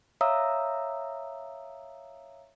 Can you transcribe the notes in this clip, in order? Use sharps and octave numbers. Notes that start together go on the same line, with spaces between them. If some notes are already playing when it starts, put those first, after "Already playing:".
C#5 E5 F5 A#5 D#6 E6